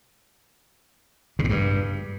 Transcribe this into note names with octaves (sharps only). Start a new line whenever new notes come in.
C#3
A2
G2